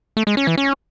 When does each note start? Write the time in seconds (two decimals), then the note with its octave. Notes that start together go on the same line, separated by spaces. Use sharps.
0.17 A3
0.27 G#3
0.37 C#4
0.47 E3
0.58 C#4